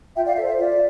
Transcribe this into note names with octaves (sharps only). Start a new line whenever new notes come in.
F4 E5 G5
D5 F5
A4 C5 E5
E5
F4 D5